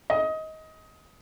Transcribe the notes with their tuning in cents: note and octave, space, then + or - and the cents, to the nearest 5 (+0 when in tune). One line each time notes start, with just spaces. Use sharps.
D#5 +20